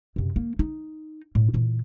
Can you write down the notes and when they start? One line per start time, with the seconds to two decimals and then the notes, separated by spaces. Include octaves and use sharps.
0.16 F#2 C3
0.36 A#3
0.59 D#4
1.35 A2
1.54 A#2 E3